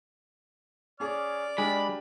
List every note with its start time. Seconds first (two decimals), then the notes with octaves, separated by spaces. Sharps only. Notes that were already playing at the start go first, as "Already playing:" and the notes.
1.00 C#4 G#4 D5 F6
1.58 G#3 D4 G4 G#5 B5